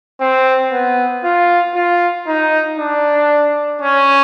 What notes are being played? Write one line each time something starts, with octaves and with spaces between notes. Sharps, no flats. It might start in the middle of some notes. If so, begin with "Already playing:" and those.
C4
B3
F4
F4
D#4
D4
C#4